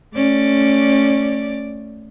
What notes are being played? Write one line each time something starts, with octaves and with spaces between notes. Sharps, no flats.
A3 C#4 D5